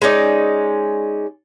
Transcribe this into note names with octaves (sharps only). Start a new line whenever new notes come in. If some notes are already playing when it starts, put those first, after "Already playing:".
G#3 C#4 D#4 D5